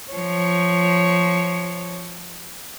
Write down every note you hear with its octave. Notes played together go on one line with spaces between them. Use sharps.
F3 C#5